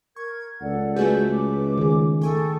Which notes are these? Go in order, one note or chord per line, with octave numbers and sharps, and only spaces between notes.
A#4 C#6 G#6
C#2 A4 D5 F#5
A3 F#4 G#4 B4 G6
D6
D#3 G#4
A3 A4 G5 G#5 C#6 D#6